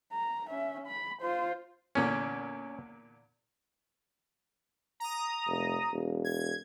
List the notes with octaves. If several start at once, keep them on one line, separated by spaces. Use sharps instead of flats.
A#5
C#4 E5
B5
F4 C5
E2 A#2 D3 C#4
A#5 D#6
F1
E1
G#6